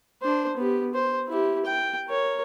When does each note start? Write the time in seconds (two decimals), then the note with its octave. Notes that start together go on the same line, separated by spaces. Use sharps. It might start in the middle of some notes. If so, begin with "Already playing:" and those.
0.22 D4 C5
0.57 B3 G4
0.94 C5
1.28 E4 G4
1.66 G5
2.07 A#4 C#5